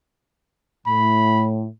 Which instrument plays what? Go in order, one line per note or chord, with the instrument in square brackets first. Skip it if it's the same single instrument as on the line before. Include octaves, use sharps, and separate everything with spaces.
[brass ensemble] A2 [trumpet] B5